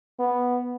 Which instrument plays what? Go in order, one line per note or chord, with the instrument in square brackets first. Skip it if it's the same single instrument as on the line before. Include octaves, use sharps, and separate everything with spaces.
[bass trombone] B3